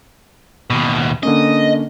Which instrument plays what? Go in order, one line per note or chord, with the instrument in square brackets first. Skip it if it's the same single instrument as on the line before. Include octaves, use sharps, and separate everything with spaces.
[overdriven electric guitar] D#2 B2
[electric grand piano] D3 A#3 C#4 [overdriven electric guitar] D#5